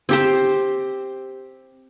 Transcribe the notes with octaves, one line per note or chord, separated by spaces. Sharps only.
C4 G4 C5